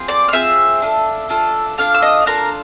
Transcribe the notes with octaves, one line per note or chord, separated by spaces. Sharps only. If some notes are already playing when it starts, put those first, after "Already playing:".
Already playing: C4 F4 G#4
D5 D6
F6
C4 F4 G#4 E5 E6
D4 F4 A4
D4 F4 A4
D4 F4 A4 F5 F6
E6
D#5 D#6
D4 F4 A4 A#4 A#5